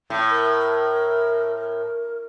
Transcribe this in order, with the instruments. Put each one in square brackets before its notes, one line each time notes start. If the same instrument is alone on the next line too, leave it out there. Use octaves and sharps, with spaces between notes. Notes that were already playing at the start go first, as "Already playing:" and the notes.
[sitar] A2
[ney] A#4